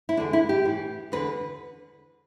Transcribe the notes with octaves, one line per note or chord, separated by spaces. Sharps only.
E4
E2 D3 D4
E4
G4
A2 E3
E2 D3 B4